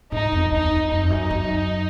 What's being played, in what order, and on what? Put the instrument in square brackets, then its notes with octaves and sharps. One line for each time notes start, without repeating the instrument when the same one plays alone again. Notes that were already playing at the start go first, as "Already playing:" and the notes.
[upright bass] G#2 [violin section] D#4
[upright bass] F2
[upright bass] E2 [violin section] D#4
[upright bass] F2
[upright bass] F#2 [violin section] D#4
[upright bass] F2
F#2
F#2